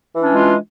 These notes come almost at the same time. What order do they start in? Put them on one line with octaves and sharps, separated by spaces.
E3 D4 C#4 G#3 F4